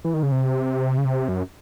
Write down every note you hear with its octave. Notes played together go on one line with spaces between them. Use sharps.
E3
D#3
C#3
C3
C#3
C3
F#2